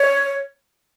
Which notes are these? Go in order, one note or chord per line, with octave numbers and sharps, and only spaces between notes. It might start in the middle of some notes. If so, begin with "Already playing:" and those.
Already playing: C#5